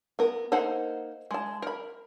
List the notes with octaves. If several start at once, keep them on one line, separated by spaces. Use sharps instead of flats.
B3 A#4
A#3 D#4 A4 C5 F#5
G#3 A5
A#4 B5